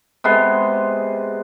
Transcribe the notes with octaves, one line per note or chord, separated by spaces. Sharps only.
C3 G#3 B3 C6